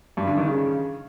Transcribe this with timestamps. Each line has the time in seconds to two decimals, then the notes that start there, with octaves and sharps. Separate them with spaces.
0.17 G2
0.27 D3
0.37 D#3
0.48 C#3